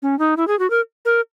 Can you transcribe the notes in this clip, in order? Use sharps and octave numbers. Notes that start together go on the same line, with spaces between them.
C#4
D#4
E4
G#4
F#4
A#4
A#4